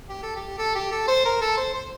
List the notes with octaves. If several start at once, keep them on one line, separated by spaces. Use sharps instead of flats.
G4
A4
G4
A4
G4
A4
C5
A#4
A4
C5
C5